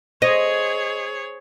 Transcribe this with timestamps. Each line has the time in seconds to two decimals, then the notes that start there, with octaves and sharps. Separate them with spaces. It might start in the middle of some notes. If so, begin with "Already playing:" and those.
0.22 G#4 C5 C#5 D#5